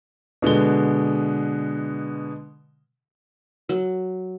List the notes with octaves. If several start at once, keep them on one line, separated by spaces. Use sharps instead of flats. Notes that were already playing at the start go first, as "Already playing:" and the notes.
B2 D3 G#3 G7
F#3